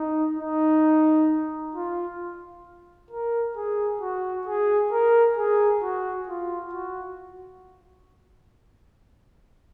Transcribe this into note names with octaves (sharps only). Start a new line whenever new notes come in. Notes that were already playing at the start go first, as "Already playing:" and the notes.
Already playing: D#4
D#4
F4
A#4
G#4
F#4
G#4
A#4
G#4
F#4
F4
F#4